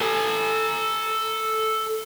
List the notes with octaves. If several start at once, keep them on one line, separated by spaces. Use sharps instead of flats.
A4 G#5